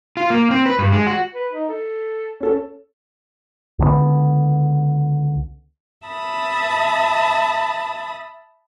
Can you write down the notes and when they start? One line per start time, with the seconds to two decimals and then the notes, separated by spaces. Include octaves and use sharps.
0.17 F4
0.30 A#3
0.51 C4
0.66 B4
0.79 G2
0.92 G#3
1.07 F#4
1.34 B4
1.52 D#4
1.69 A4
2.40 C#4 A4
3.79 C#2 D3 E3 B3
6.07 E5 A5 B5 D#6